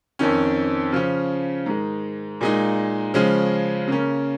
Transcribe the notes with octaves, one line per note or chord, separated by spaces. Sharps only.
F2 D#3 C#4
C#3 F3 C#4
G#2 D#3 G#3
A#2 G#3 D#4
C#3 F3 G#3 C#4
C#3 A#3 C#4